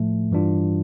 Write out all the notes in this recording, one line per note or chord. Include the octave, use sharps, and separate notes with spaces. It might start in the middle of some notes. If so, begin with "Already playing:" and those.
Already playing: A2 F3 A3
G2 E3 G3 D4 F4